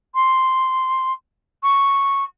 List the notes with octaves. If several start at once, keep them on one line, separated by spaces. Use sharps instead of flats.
C6
C#6